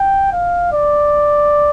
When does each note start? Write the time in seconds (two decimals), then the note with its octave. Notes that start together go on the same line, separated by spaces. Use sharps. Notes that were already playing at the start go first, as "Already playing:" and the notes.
Already playing: G5
0.32 F5
0.73 D5